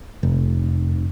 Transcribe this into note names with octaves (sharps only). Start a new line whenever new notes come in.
F1